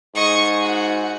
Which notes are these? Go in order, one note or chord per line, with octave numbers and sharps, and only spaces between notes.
G#2 D#5 C#6
F#4